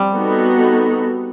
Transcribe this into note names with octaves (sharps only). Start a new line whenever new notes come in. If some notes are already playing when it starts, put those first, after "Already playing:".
Already playing: G3 C4
B3 D#4 F#4 A4